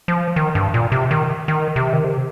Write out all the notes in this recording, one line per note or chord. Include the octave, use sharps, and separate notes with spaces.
F3
D#3
G2
A#2
C3
D#3
D#3
C3
D#3
C3